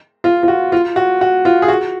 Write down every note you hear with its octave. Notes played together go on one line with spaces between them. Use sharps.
F4
F4
F#4
F4
F#4
F#4
F4
G#4
F#4